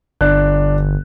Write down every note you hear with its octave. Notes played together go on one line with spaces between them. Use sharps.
G1 D4 F#6